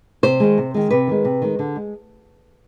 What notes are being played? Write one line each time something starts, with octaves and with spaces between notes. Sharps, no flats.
C3 C5
D#3 G#3
C3
D#3 G#3
C3 B4
D#3 G#3
C3
D#3 G#3
D3
G#3